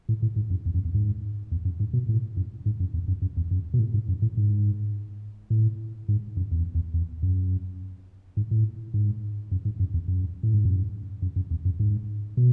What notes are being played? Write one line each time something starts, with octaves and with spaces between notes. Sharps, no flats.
A2
A2
G#2
F#2
E2
F#2
E2
G#2
E2
F#2
G#2
B2
A2
F#2
G#2
F#2
E2
F#2
F#2
E2
F#2
B2
A2
G#2
F#2
A2
G#2
A2
G#2
F#2
E2
E2
E2
F#2
G#2
A2
G#2
F#2
G#2
F#2
E2
F#2
A2
G#2
F#2
F#2
F#2
E2
F#2
G#2
B2